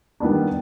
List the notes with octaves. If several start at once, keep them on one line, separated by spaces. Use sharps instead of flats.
D#3 G3 B3 D4